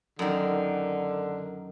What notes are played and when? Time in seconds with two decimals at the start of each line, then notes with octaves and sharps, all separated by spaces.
0.19 F#2 D3 D#3